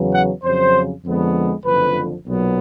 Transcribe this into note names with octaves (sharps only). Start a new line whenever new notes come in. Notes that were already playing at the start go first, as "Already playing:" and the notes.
Already playing: E2 C#3 F#3 B3
F#5
F2 C#3 F#3 C5
F2 D3 F3 G#3 B3
F#1 F2 D3 F3 B4
B1 A#2 F#3 B3